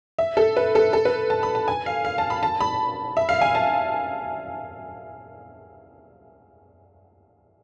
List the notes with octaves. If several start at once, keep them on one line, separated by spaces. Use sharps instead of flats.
E5
A4
B4
A4
A4
B4
A5
B5
A5
G#5
F5
F5
A5
B5
A5
B5
E5
F5
G#5
A5